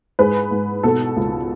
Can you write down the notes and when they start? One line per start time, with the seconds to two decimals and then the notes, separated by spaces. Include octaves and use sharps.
0.19 G#2 G#4 B4
0.51 G#2
0.83 B2 A4
1.16 C#2